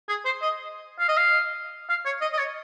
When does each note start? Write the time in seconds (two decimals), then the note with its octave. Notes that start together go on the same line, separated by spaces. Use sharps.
0.09 G#4
0.25 C5
0.41 D#5
0.99 F5
1.08 D#5
1.17 F5
1.89 F5
2.05 C#5
2.21 D#5
2.33 D#5
2.38 C#5